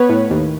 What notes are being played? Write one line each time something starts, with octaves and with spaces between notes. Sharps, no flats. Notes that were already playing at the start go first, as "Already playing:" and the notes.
Already playing: B3 B4 C#5
A2
D#2